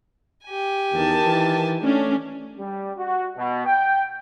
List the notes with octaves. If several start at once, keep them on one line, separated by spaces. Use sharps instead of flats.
G4 G#5
E2 D#3 A5
E3
A3 C#4 D4
G3
F#4
B2
G5